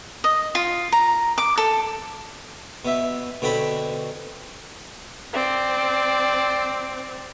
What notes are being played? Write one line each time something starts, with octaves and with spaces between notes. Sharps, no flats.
D#5
F4
A#5
D6
A4
B2 E5
B2 D3 C4 C#5 B5
C4 D5